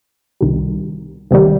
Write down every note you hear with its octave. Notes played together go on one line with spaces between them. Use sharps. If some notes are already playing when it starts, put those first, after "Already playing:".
C2 C3 D#3 G3
C2 C3 D#3 G3